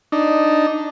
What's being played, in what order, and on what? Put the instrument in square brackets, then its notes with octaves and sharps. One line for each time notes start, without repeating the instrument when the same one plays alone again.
[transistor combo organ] D4 D#4